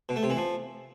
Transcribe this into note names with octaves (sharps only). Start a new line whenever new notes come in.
B2
A3
C3
E3
F3